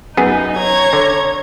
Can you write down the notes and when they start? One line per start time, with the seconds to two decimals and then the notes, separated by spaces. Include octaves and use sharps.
0.17 F#2 B3 D#4 G#4
0.57 C#5 A#5 G#6
0.93 D3